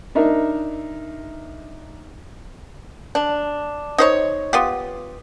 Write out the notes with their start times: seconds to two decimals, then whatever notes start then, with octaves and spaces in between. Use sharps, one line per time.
0.15 D4 D#4 A#4 E5
3.15 D4
3.98 D#4 C5 C#5
4.53 B3 F4 G4